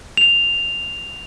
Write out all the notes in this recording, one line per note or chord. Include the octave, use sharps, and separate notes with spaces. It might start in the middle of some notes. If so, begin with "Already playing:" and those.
F7